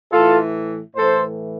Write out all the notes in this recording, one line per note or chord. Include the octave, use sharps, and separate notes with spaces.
A2 E3 F4 A4
A2 E3 A4 C5